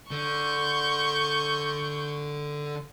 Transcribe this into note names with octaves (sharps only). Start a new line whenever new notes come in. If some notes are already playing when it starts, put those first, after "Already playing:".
D3 C#6 G6